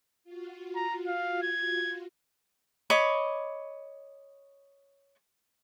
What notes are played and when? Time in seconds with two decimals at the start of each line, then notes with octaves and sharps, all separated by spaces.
0.24 F4 F#4
0.76 A#5
1.07 F5
1.42 G#6
2.90 C#5 D#5 B5 D6